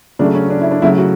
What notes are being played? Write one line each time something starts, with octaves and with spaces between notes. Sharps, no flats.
C#3 F#3 A3 D4
C#4
D4
E4
D4
C#3 F#3 A3 E4
F#4